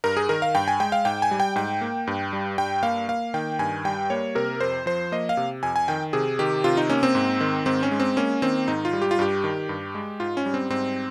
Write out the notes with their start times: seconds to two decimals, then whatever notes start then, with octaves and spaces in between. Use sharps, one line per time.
0.04 G2 A#4
0.17 G#4
0.29 D#3 A#4
0.42 F5
0.55 G2 G5
0.68 G#5
0.80 G#3 G5
0.92 F5
1.05 G#2 G5
1.22 G#5
1.31 G3
1.40 G5
1.56 G#2 G5
1.81 A#3
2.07 G2
2.33 G3
2.58 G2 G5
2.83 A#3 F5
3.08 A#3 F5
3.34 D#3 G5
3.59 G2 G#5
3.85 G3 G5
4.10 A#3 C#5
4.35 C3 A#4
4.61 F2 C5
4.86 F3 C5
5.12 A#3 D#5
5.29 F5
5.37 C3
5.63 F2 G#5
5.76 G#5
5.88 D#3 G5
6.13 C3 G#4
6.39 D#3 G4
6.64 C3 F4
6.77 D#4
6.90 A#3 C#4
7.03 C4
7.15 G#2
7.41 D#3
7.66 G#2 C4
7.83 C#4
7.91 G#3
8.00 C4
8.17 A#3 C#4
8.42 D#3 C4
8.68 G#2 D#4
8.85 F4
8.93 G3
9.02 G4
9.11 F4
9.19 G2 G4
9.44 D#3
9.69 G2
9.95 G#3
10.20 G#2 F4
10.37 C#4
10.46 G3
10.54 C4
10.70 G#2 C4